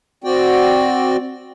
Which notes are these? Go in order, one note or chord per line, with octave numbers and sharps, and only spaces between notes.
C4 F#4 D5 G5